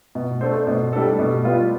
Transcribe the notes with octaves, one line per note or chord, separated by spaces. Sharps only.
B2
A3 D4 A4 C5
B2
G3 D4 A4
B2
G3 B3 F4